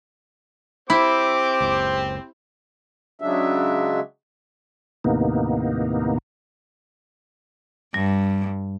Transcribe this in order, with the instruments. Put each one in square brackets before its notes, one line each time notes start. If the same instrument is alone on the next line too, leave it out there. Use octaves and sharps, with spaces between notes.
[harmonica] C4 G4 C5 [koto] E4 [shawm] D6
[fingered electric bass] F#1 C#2
[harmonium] C#3 F#3 G#3 D4 E5
[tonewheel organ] D#2 A2 C3 A#3 B3 D#4
[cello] G2 [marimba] G3